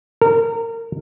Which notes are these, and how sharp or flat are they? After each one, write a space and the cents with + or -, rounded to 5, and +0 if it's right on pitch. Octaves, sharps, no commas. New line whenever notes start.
A#4 -25